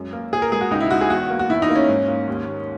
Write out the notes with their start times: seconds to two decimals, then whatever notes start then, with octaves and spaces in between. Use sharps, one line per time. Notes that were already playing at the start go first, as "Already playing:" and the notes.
Already playing: F#2 G#3
0.13 A#3
0.32 A#2 G#4
0.42 A#4
0.52 G#3 G#4
0.61 F#4
0.71 C#2 D#4
0.80 E4
0.91 G#3 F#4
1.01 G#4
1.10 E2 F#4
1.30 A#3
1.39 F#4
1.49 E2 E4
1.62 D#4
1.70 A#3
1.75 C#4
1.88 G#2
2.08 A#3
2.28 D#2
2.47 D#2